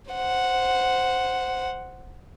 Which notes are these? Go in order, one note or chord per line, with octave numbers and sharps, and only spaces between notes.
C5 F#5